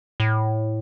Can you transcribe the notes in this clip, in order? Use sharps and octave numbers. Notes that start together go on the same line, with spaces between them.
A2